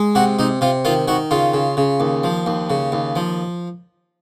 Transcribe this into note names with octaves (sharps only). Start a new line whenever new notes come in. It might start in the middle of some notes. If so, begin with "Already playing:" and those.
Already playing: G#3
C3 F#4
C3 D#4
C3 F4
D#3 F4
D#3 F#4
C#3 F4
C#3
C#3
D#2
F3
D#2
C#3
D#2
F3